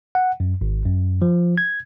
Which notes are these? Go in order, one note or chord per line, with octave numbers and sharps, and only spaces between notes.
F#5
F#2
G#1
F#2
F3
G#6